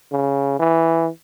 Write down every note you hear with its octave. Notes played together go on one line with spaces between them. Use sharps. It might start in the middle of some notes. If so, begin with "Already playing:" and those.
C#3
E3